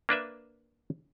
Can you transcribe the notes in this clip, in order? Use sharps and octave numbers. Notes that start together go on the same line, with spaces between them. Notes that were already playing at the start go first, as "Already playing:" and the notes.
A#3 D4 B4 E5